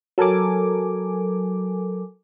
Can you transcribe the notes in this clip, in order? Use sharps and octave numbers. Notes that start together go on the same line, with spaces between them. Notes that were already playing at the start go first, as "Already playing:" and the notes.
F#3 A4 A#4 G#5 D6